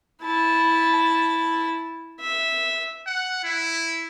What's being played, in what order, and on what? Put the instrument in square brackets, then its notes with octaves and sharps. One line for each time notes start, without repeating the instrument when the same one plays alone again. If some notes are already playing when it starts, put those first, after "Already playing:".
[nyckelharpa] E4 A5
E5
[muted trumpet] F#5
E4